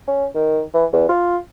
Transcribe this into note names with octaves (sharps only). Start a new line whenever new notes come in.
C#4
D#3
E3
E2
F4